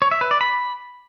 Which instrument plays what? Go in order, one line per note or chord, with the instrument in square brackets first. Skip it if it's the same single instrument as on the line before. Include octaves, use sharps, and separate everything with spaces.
[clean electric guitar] C#5
E5
B4
D5
B5